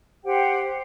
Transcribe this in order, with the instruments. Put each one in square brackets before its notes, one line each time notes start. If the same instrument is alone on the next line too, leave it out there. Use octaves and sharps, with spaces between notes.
[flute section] G4 C5 F#5 G5